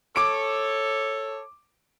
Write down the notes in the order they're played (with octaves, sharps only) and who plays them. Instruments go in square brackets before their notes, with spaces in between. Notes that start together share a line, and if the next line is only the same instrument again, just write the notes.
[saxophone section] A4 C#5 [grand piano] D6 D7